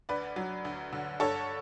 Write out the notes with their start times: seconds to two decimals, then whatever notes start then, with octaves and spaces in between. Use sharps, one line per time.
0.09 D2 B4 D5
0.36 F#3
0.65 D2
0.93 D3
1.20 G2 A4 C#5